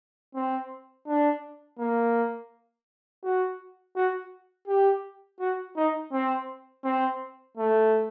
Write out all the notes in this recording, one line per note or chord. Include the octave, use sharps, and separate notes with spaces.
C4
D4
A#3
F#4
F#4
G4
F#4
D#4
C4
C4
A3